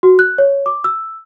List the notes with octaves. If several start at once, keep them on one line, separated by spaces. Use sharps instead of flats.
F#4
F#6
C#5
D6
E6